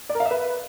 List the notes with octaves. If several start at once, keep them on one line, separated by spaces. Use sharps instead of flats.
D5
A#4
F5
E5
B4